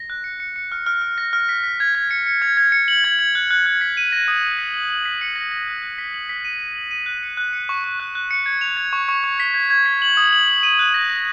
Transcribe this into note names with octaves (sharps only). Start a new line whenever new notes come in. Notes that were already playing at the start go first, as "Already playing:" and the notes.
Already playing: A#6
F#6
C#7
C#7
C#7
F6
F6
F6
A#6
F6
B6
B6
G#6
G#6
C#7
C#7
G#6
G#6
C#7
F#7
G#6
G#6
F#6
F#6
F#6
B6
D#7
A#6
D#6
D#7
B6
F#7
F#7
B6
C#7
A#6
A#6
F#6
F#6
B6
F#7
B6
D#7
D#7
F#7
D#7
F#6
C#7
F#6
C#7
C#6
C#6
F#6
F#6
C#7
G#6
F7
G#6
C#6
C#6
C#6
B6
G#6
G#6
B6
F#7
D#6
F#7
F#7
D#7
F#6
A#6
A#6